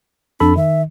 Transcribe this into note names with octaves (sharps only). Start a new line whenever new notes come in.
F2 D4 A4 B5
D#3 E5